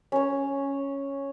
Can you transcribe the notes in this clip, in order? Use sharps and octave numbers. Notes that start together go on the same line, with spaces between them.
C#4 C#5